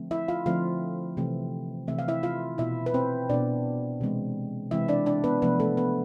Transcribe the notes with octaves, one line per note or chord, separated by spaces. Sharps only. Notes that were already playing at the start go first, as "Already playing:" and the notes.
Already playing: D3 F3 A3 C4
E4 E5
F4 F5
D3 F3 A3 C4 F4 F5
C3 E3 A3 C4
C3 E3 A3 C4 E5
F5
E4 E5
F4 F5
B2 B3 E4 E5
B4
C4 C5
B2 B3 D4 D5
C3 E3 G#3 C4
C3 E3 G#3 C4 E4 E5
D4 D5
D4 D5
B3 B4
C3 F3 A3 B3 B4
A3 A4
B3 B4